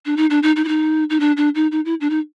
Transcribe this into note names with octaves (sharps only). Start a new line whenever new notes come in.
D4
D#4
D4
D#4
D#4
E4
D#4
D#4
D4
D4
D#4
D#4
E4
D4
D#4